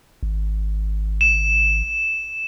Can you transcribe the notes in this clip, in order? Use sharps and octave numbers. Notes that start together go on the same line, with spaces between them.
G#1
E7